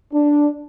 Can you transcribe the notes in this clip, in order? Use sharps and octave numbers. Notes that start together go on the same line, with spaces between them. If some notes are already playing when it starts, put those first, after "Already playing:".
D4